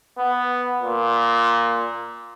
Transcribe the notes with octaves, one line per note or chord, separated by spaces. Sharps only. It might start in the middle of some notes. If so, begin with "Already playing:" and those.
B3
A#2